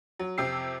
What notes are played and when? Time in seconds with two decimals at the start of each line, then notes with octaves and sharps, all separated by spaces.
0.20 F#3
0.38 F2 C3 G4 E6 C7